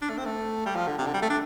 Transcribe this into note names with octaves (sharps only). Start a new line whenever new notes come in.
D4
A3
C4
A3
G3
F3
D3
C3
D3
G3
A3
D4